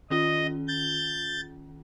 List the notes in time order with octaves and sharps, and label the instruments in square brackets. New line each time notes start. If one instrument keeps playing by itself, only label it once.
[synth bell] D#3 C#4 F4 [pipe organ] D#5
[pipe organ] G6 A6